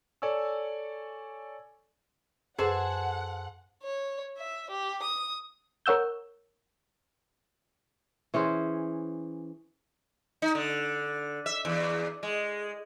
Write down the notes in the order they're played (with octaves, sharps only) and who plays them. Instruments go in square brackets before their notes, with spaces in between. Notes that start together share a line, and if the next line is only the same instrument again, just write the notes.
[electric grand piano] A4 C#5 D5 G#5 C#6 E6
[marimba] F#2 B4 E6 [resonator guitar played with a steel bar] G#4 A4 C5 [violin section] F#5
[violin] C#5
E5
G4
D#6
[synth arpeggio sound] A#4 C#5 F#5 E6 G6
[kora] E3 C#4 G#4 C5
[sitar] D#4
D3
E5
E2
G#3